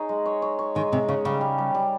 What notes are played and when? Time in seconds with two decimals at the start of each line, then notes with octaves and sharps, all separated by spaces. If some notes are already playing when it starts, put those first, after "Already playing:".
Already playing: D#4 G#4 C#5
0.09 G#3
0.26 C#5
0.42 C#5
0.59 C#5
0.75 D#3 G#3
0.92 C3 G#3
1.08 C#3 C#5
1.25 C#3 G3
1.41 G3
1.58 G3
1.74 G3